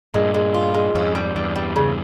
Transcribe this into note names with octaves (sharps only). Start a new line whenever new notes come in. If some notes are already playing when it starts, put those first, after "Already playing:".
G2 A#2 G#3
G#3
F4
G#3
F2 G#2 C#4
G3
E2 G2 G3
G3
C#3